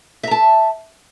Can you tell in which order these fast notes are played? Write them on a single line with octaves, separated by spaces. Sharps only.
E5 A#5 A5